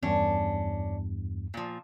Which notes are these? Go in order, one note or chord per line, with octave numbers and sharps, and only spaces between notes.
E2 G2 C#4 D4
A#2 F3